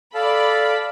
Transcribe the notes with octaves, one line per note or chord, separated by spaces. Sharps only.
A4 D5 F5 A5 B5